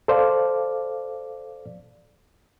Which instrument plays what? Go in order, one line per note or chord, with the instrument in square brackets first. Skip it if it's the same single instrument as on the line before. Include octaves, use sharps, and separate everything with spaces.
[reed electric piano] A4 C5 D5 F5